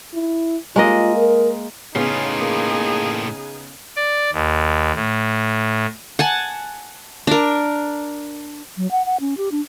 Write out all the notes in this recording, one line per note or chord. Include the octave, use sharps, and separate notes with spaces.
E4
G#3 A#3 F4 D#5
A#4
A2 C#3 B3 C#4 D#4 F4 G#4
A#3
D5
D#2
A2
F#5 G#5 A5
D4 A#4
F#3
F#5
F#5
C#4
G4
D4